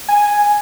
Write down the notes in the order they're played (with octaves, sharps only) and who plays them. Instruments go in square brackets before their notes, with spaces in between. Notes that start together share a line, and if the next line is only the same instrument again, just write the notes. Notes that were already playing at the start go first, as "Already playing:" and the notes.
[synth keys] G#5